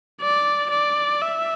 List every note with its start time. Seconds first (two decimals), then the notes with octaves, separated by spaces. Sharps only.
0.21 D5
0.70 D5
1.22 E5